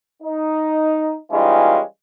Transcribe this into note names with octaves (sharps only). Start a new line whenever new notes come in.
D#4
E3 G3 G#3 C#4 D#4 F4